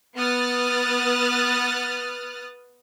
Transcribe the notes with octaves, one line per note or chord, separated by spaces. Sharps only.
B3 D#6 F6 F#6 A6